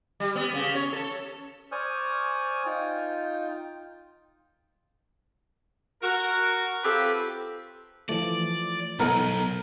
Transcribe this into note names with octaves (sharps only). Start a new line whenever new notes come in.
G3
B3
C#3
C#5
A4
C5 D5 G#5 C#6 D#6 F6
D#4 F4 G5
F#4 A#4
C4 F4 G4 A4 B4
E3 F3 A3 D5
B1 C3 B3 D#4 A4 A#4